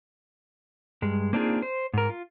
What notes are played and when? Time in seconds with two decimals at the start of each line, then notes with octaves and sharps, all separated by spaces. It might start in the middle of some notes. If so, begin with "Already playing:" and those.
1.02 G2 G#3
1.33 A#3 C4 D4 D#4 F4 G#4
1.62 C5
1.94 G#2 A#4
2.10 F4